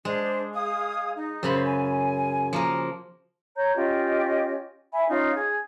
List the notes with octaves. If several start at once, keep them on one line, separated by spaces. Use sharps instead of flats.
G#3 D4 C5
G#4 F5 D#6
D#4
F#2 C#3 C5 B5
G#5
F3 A#3 A#4
C#5 A#5 G6
C#4 F4 G4 D#5
E5 G#5 B5
C#4 D#4 F4
G#4